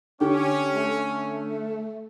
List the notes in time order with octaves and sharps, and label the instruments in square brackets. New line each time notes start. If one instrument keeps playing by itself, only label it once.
[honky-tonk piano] D3 [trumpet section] C#4 [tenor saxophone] G4
[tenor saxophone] A3